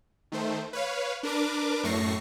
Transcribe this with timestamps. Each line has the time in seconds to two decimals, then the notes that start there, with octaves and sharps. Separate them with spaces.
0.32 D#3 A3 C5
0.73 B4 C#5 F5
1.23 D4 A#4 B4 D6
1.84 F#2 A2 A3 C#6 A#6 C7